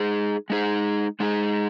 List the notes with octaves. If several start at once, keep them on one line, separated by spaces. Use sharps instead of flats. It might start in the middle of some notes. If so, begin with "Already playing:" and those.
Already playing: G#3 D#4 G#4
G#3 D#4 G#4
G#3 D#4 G#4